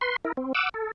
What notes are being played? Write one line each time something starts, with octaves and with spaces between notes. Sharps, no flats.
B4 C6
E4 A#4
C4
F#5 D6 E6
A4